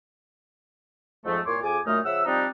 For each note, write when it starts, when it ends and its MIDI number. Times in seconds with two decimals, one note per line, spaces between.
1.25 1.40 41
1.25 1.40 44
1.25 1.40 53
1.25 1.40 57
1.46 1.58 36
1.46 1.58 46
1.46 1.58 65
1.46 1.58 73
1.46 1.58 84
1.46 1.58 86
1.63 1.78 41
1.63 1.78 68
1.63 1.78 80
1.63 1.78 86
1.86 1.99 42
1.86 1.99 46
1.86 1.99 57
1.86 1.99 63
1.86 1.99 87
1.86 1.99 89
2.05 2.21 49
2.05 2.21 53
2.05 2.21 76
2.05 2.21 78
2.05 2.21 88
2.26 2.46 53
2.26 2.46 55
2.26 2.46 60
2.26 2.46 62
2.26 2.46 63